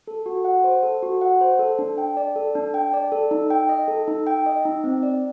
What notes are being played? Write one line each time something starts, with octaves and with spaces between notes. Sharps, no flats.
A4
F#4
F#5
C5
A4
F#4
F#5
C5
A4
D4
G5
D5
A4
D4
G5
D5
A4
D#4
G5
D#5
A4
D#4
G5
D#5
D#4
C4
D5